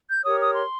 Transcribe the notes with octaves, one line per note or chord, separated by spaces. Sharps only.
G6
G4 A#4 C#5 D#6
D#6
C6